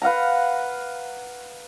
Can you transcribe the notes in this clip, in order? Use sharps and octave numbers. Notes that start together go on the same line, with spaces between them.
B4 F5 F#5 A#5